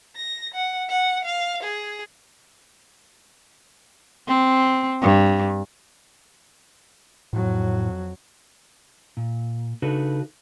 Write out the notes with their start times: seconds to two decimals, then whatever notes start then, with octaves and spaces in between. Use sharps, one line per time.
0.16 A#6
0.54 F#5
0.89 F#5
1.25 F5
1.63 G#4
4.28 C4
5.02 G2
7.33 F2 A2 F#3
9.17 A#2
9.82 C#3 D4 D#4 F#4 A4 B4